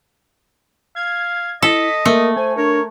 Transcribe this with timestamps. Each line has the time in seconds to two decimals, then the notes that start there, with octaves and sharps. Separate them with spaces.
0.96 F5 G#6
1.62 E4 A4 D#5 B6
2.05 A3 A#3 A#4
2.36 C5 G#5
2.57 D4 A#4 C#5